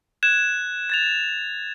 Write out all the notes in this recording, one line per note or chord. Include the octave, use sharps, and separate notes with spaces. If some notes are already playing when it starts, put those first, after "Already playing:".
F#6 G#6 E7
G#6 A6 F7